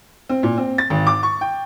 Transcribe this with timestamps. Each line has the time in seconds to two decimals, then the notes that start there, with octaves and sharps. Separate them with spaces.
0.29 C4
0.43 A#2
0.58 C4
0.78 A6
0.90 G#1
1.07 D6
1.23 C#6
1.41 G5